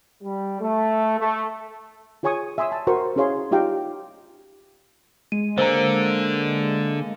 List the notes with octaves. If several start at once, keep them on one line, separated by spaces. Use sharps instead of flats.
G3
A3
A3
F4 G#4 C#5 G#5 C#6 D#6
E5 G#5 C6 D#6 E6
A5
F#4 A#4 C5 C#6
C#4 E4 G#4 C#5 F5 C6
D#4 F4 G4 F5 G5 A#5
G#3 D#7
D3 A#3 C5 G#5 A#5 E6